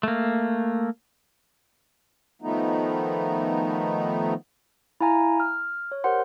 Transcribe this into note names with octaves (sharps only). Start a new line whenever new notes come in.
A3 A#3
D#3 F3 A3 B3 D#4
E4 F5 G#5 A#5
F6
C#5
G4 A#4 C5 F#5 C6